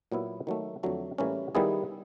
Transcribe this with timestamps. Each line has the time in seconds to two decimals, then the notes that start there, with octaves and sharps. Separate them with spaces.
0.12 A#2 F#3 B3 E4
0.47 D#3 F#3 A3
0.83 F2 D3 F#3 A3
1.18 A2 E3 G3 A#3 C#4
1.55 D#3 G3 B3 E4 G#4